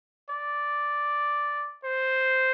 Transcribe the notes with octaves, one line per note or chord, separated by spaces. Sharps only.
D5
C5